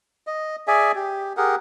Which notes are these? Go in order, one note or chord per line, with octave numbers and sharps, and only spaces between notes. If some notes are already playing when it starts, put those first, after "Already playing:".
D#5
G#4 D5 E5 G#5
G4
G4 G#4 A#4 F#5